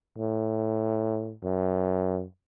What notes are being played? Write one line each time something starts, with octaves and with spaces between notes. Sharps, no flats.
A2
F#2